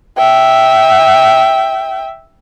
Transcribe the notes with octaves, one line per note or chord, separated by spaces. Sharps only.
E5 G5